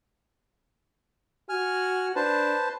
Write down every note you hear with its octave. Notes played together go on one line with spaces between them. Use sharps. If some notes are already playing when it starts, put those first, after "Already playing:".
F#4 G#5 F6
D4 B4 C5 A5